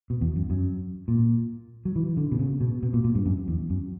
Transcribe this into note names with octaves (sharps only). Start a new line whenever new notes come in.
B2
E2
F#2
F#2
A#2
F#3
E3
D3
B2
C#3
B2
B2
A#2
A#2
G2
F#2
E2
F#2